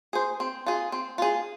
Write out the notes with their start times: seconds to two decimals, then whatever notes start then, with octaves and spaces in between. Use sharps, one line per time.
0.13 G#4 C5
0.40 C4
0.66 F4 G#4
0.92 C4
1.18 F4 G#4